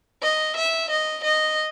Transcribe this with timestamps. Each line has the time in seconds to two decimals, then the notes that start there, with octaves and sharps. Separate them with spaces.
0.22 D#5
0.56 E5
0.90 D#5
1.24 D#5